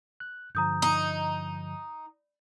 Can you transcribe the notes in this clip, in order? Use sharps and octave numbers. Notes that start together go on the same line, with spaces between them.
F#6
G2 D3 F3 A#5 D#6 G6
D#4